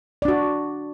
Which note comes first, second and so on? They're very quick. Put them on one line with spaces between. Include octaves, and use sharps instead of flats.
D5 D4 F#4